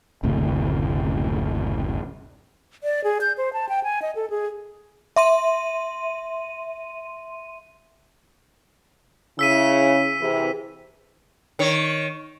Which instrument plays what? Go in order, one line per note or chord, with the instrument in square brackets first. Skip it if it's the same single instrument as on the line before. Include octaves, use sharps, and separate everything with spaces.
[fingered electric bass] F#1 D2 A2 C3
[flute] D5
G#4
G6
C5
A5
G5
G#5
D#5
A4
G#4
[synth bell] E5 C6 D#7
[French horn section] C#3 E4 [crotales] E6 B6 D#7
[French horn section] C3 E3 G#4
[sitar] D#3 C#5